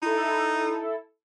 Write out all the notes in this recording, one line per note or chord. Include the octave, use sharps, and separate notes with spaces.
D#4 E4 A4